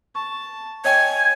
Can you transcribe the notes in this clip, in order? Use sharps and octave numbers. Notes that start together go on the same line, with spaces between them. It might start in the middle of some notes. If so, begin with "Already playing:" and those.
A5 C#6
C#5 D#5 G5 G#5 G#6